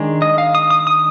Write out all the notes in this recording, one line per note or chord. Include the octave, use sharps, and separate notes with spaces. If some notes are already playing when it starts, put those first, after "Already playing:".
Already playing: D#3 G#3 D4
D#5
F5
D#6
D#6
D#6